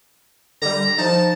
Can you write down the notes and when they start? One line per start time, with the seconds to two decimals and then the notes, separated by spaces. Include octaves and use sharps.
0.62 D3 G3 A#5
0.98 F3 D#4 A5